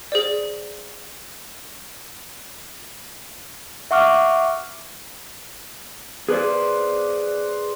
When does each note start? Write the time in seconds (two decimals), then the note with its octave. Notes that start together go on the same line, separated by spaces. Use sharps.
0.12 G#4 C5 D5
3.91 E5 F#5 C#6 D6 F6
6.29 G#4 B4 C5 D5